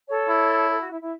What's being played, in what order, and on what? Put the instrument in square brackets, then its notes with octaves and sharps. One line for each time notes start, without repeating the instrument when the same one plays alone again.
[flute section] A4 C#5
[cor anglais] E4
[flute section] A4
F#4
E4
E4